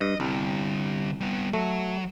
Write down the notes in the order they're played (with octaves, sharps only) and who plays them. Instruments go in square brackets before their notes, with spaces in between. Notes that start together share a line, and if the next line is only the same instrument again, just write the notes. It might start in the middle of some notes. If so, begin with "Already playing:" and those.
[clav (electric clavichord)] G2 [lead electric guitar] D#5
[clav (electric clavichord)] C2 [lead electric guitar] D3 G3
[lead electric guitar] G3 B3
[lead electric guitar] F#3 [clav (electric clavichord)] A3